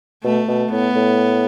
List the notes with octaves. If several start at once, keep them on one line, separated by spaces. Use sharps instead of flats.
B2 A3
B2
A2 B3
A2